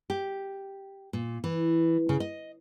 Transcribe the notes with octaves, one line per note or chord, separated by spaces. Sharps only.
G4
A#2
E3
C#3
D#5